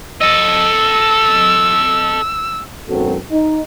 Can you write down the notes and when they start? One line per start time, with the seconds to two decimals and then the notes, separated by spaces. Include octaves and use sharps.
0.21 A4 D#5 E6
2.89 G#1 F#2 F#3 B3 C4 A4
3.30 D#4